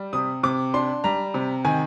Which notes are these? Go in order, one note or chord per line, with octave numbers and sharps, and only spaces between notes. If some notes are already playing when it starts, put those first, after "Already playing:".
Already playing: G3
C3 D#6
C3 D6
D4 C6
G3 A#5
C3
D#3 G#5